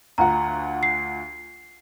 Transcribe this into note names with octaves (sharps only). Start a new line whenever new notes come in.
D2 F4 F#5 A#5
C7